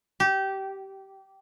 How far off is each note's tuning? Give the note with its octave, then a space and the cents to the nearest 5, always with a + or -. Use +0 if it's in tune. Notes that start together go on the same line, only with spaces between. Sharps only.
G4 -20